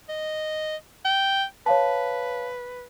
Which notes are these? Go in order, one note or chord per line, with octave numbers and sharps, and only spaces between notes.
D#5
G5
B4 C#5 F5 A5